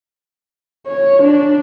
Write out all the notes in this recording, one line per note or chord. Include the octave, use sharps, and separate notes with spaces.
C#5
D4